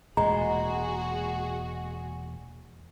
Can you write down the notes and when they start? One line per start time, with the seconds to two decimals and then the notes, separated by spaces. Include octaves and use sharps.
0.17 E1 A#2 G#3 F#4 G#4 A#5